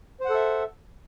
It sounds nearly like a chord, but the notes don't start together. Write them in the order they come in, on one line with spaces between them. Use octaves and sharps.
C5 F#5 A4 E5